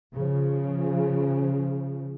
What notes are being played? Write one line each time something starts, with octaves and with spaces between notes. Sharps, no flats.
C#3 F3